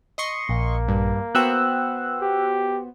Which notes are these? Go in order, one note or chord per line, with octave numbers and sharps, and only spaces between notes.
D#5 C6 C#6
A#1 A#3
G2
B3 F#4 C5 G5 E6 F#6
G4